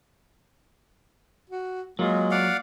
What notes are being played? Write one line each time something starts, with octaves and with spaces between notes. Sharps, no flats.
F#4
F#3 G#3 A#3 F4
D5 F5 F#5